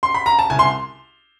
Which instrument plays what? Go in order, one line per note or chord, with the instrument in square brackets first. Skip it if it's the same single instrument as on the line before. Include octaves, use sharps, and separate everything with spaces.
[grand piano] C6
B5
A#5
A5
C2 G#5
C6